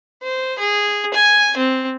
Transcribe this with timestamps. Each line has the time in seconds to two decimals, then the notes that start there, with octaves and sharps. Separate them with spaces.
0.23 C5
0.59 G#4
1.14 G#5
1.57 C4